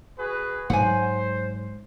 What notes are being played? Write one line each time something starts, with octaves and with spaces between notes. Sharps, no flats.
F#4 G#4 B4
G#2 F#3 C5 F#5 G#5